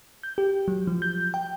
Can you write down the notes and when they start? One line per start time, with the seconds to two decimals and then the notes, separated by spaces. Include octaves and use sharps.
0.23 G6
0.38 G4
0.68 F#3
0.87 F3
1.02 G6
1.34 G5